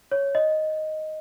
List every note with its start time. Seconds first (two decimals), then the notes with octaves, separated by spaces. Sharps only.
0.12 C#5
0.35 D#5